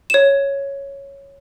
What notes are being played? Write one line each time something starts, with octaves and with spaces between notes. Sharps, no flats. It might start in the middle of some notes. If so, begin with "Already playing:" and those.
C#5 E7